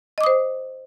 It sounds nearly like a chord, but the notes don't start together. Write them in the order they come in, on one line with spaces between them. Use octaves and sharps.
D#5 D6 D#6 C5